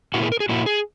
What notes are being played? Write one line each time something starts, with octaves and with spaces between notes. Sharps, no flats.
A#2 A#3 E4 F#4
G#4
A#4
G#4
A#2 A#3 E4 F#4
G#4